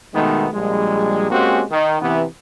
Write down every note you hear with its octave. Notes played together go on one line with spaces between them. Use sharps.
B2 D#3 G#3 A3 B3 D#4
A#1 G3 G#3
G#3 A#3 C4 C#4 F#4 G4
D#3
C3 E3 B3